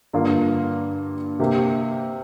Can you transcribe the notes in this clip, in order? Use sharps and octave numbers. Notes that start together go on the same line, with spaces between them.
G2 D3 A#3 F4
C3 A#3 G4